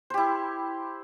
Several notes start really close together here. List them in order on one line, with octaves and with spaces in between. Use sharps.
C5 G4 E4